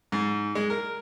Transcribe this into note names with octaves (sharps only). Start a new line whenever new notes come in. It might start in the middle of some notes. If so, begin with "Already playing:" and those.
G#2
G#3
A#4